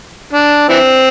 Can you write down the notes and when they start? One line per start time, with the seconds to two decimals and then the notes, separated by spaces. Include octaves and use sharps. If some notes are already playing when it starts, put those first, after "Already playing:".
0.33 D4
0.69 E3 C4